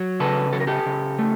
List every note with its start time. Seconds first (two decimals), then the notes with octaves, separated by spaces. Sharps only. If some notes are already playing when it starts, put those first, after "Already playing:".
Already playing: F#3
0.20 C#3 A4 B4
0.53 F#3 A4
0.60 A#4
0.67 G4 A4
0.86 C#3
1.19 A3